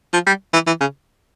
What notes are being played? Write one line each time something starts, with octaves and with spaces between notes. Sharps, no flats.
F3
G3
E3
E3
C#3